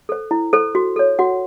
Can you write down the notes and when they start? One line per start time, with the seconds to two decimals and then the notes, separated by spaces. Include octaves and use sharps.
0.09 A4 C5
0.31 E4
0.53 A4 C5
0.75 F#4
0.96 A4 C#5
1.19 F#4 F#5